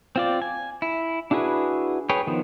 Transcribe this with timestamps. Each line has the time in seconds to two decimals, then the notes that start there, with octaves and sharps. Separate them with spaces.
0.16 C4 F4 D5
0.42 G#5
0.82 E4
1.31 D4 E4 F#4 G#4 B4
2.09 G#4 B4 C#5 G5
2.27 D#3 F3 B3